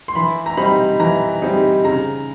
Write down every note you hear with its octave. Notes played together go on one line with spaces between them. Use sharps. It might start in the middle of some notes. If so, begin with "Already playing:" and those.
C6
E3 B5
A#5
G3 C4 D#4 B5
E3 A#5
G3 C4 D#4
C#3 A#5